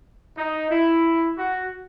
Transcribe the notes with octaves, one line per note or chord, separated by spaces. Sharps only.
D#4
E4
F#4